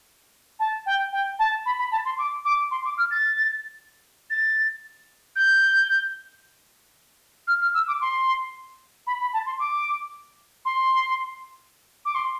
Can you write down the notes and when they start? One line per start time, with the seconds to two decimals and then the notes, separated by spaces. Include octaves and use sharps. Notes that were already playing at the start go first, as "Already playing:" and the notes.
0.59 A5
0.86 G5
1.12 G5
1.39 A5
1.66 B5
1.79 B5
1.92 A5
2.05 C6
2.18 D6
2.45 D6
2.71 C6
2.85 D6
2.98 F6
3.11 A6
4.30 A6
5.36 G6
7.48 F6
7.62 F6
7.74 E6
7.88 D6
8.01 C6
9.07 B5
9.20 B5
9.33 A5
9.46 C6
9.59 D6
10.65 C6
12.05 D6
12.15 C6